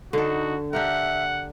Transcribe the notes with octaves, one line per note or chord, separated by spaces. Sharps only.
D3 D#4 F#4 A4
D4 G4 A#4 E5 F#5